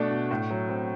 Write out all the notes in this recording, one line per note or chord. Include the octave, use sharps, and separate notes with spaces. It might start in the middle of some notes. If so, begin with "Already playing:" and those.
Already playing: B2 A3 D4
B2
A2
F#3
C4